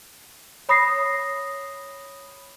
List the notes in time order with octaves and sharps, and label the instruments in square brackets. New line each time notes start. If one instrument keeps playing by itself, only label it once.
[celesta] C#5 B5 D#6 A#6 C7